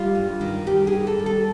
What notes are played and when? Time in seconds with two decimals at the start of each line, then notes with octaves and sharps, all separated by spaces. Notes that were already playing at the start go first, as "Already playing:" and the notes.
Already playing: G3 F4
0.15 G2
0.41 D#3
0.67 G3 G4
0.87 G#4
0.93 D#3
1.07 A4
1.19 G3
1.26 A4